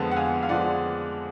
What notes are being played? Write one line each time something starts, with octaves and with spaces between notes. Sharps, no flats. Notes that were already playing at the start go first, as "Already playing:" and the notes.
Already playing: F2 D3 F3 G#3 B3 F#5 A5
F#5
F5 G#5
F5
F2 D3 F3 G#3 B3 D5 F#5